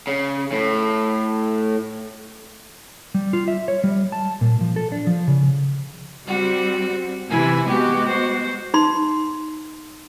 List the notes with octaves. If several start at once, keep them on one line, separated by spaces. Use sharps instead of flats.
C#3
A2
G3
F4
E5
C#5
G3
A5
A#2
F3
A4
D4
F3
C#3
G3 C4 F#4
C3 E3 E4 G#5
G#3 B3 F#4 G4
C5
D#4 C6